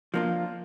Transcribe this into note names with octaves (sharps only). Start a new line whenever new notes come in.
F3 A#3 D4 F4